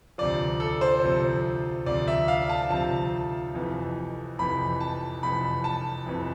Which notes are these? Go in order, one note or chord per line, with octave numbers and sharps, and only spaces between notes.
D2 C3 F3 D5
A4
C5
D2 C3 F3
D2 C3 F3 D5
E5
F5
A5
D2 C3 F3 A5
F1 F2 E3
F1 F2 E3 B5
A5
F1 F2 E3 B5
A5
F1 F2 E3